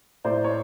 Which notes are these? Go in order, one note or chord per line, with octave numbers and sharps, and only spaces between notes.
A2 C5 D5
C#5